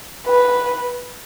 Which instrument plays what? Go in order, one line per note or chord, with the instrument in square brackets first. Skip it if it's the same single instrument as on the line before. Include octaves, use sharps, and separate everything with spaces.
[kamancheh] B4